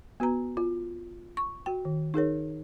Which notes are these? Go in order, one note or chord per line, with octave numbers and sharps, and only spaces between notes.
B3 F#4 B4 A#5
F4
C#6
F#4 G5
D#3
D#4 G#4 A#4 C#5